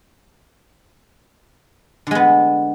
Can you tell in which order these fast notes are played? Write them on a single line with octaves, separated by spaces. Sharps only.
D3 G#3 B3